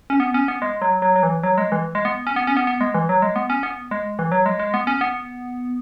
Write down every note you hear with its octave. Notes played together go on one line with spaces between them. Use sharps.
C#4
B3
C#4
B3
G#3
F#3
F#3
F#3
E3
F#3
G#3
E3
G#3
B3
C#4
B3
C#4
B3
B3
G#3
E3
F#3
G#3
B3
C#4
B3
G#3
E3
F#3
G#3
G#3
B3
C#4
B3